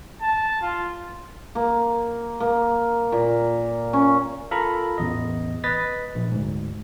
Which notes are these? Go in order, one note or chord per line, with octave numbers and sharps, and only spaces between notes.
A5
F4
A#3
A#3
A#2
C#4
F4 A4 A#4 A#5 B5
A1 E2 D#5
B4 D#5 A6 B6
A#1
D2 G#2